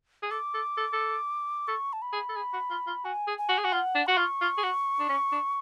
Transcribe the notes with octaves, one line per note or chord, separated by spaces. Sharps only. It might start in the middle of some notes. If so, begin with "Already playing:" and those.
G#4
A4 D6
A4
A4
A4
A4 C#6
A5
B5
G#4
A4
G#4
F#4
F4
F4
F#4 G#5
G#4
G#5
F#4
G#4
F#4
F4 F#5
D4
F#4 C#6
F4
F4
G#4
F#4
D4
C#4
D4